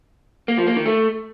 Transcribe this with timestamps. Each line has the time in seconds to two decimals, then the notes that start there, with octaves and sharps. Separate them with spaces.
0.48 A#3
0.58 F3
0.67 A#3
0.76 D#3
0.86 A3